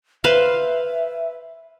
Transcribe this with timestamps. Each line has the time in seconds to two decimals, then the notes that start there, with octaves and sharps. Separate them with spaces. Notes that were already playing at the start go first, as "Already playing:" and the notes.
0.24 B4 C5 E5 F5